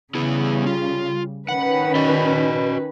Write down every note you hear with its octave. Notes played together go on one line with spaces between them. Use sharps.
C#3 G3 B3 E4 G#4
F4
D#3 C#4 B4 F#5
F#4 D5 D#5